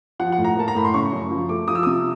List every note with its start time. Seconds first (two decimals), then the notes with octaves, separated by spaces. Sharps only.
0.19 F3 F#5
0.32 F#5
0.38 A2
0.44 A#5
0.57 A#3 A5
0.68 A#5
0.75 A2 B5
0.85 C6
0.94 C#3 C#6
1.12 F#2
1.31 F3
1.49 A3 D6
1.68 F3 D#6
1.75 E6
1.83 C3 D#6